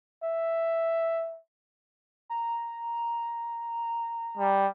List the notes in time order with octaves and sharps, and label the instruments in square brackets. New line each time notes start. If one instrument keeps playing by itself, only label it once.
[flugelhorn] E5
[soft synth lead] A#5
[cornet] G3